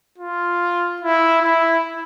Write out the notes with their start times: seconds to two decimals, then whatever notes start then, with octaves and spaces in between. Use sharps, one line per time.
0.18 F4
1.02 E4
1.42 E4